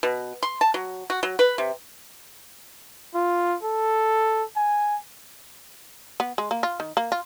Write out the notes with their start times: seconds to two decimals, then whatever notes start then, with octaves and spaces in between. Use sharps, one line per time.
0.03 B2
0.43 C6
0.61 A5
0.74 F#3
1.10 F#4
1.23 F#3
1.39 B4
1.58 C3
3.15 F4
3.63 A4
4.56 G#5
6.20 B3
6.38 G#3
6.51 A#3
6.63 F4
6.80 D#3
6.97 A#3
7.12 F4